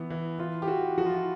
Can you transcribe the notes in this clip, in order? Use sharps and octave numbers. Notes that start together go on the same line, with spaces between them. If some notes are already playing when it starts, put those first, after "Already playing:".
Already playing: E3 B3
E3
E3 F4
G4
E3 F#4
F3 F#4
F4
E4